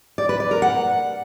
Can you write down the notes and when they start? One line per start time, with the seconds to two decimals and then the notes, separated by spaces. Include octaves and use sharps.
0.18 D5
0.29 B4
0.40 D5
0.51 A#4
0.62 F#5